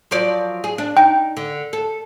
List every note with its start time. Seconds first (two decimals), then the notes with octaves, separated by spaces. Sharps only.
0.11 F3 F#3 D5
0.64 G#4
0.78 D4
0.97 D#4 G5
1.37 D3
1.73 A4